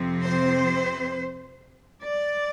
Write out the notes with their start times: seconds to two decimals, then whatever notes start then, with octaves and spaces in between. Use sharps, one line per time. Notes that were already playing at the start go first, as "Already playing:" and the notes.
Already playing: F2 C3 F3 C4
0.24 C5
2.04 D5